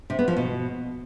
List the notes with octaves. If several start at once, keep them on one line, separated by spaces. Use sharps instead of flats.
C3
B3
F3
B2